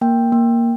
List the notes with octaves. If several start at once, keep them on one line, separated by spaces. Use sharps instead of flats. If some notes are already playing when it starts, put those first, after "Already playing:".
A#3 G5
A#3